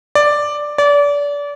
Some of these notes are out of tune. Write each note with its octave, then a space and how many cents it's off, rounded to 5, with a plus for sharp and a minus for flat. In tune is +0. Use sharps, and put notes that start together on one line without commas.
D5 +5
D5 -30